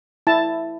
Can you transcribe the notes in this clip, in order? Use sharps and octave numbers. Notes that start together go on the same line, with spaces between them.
E4 A5